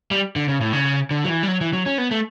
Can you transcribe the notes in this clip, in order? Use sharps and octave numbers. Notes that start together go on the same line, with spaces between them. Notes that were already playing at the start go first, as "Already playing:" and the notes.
G3
D3
C#3
A2
C#3
D3
F#3
E3
G3
F#3
E3
F#3
C#4
B3
A3